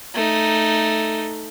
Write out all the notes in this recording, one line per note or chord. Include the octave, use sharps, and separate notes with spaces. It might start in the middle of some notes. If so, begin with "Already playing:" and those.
A3 D#4